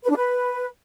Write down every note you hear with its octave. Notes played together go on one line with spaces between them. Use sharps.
B4
D4
B4